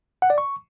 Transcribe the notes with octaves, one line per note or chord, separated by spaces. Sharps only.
F#5
D5
C#6